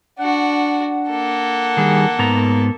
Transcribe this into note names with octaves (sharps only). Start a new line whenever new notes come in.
D4 F#4 F#5
A#3 A4
D#3 G3 G#4
G#2 B3 A#5